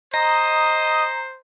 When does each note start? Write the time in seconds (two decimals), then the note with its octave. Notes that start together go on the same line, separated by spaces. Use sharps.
0.14 C5 D#5 A#5